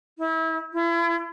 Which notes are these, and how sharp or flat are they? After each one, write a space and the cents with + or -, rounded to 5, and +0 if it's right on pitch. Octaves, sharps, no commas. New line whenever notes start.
E4 -30
E4 +40